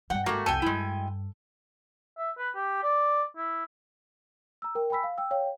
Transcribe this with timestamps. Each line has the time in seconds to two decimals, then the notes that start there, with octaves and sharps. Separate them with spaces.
0.10 G2 G3 F#5 G5
0.26 G#1 A3 A#3 F#4 G4
0.46 C2 F2 A4 G5 G#5
0.62 G2 G#3 E4
2.18 E5
2.38 B4
2.55 G4
2.83 D5
3.37 E4
4.62 A#5 E6
4.75 A#4 G5
4.90 G5 G#5 B5 E6 B6
5.03 F5
5.18 G5 E6
5.31 C#5 F5 G5